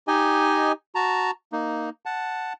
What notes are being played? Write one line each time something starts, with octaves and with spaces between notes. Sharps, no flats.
D#4 G4 D#5 G#5
F#4 A5 A#5
A#3 D#4
F#5 A5